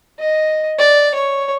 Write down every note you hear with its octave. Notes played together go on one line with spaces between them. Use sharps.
D#5
D5
C#5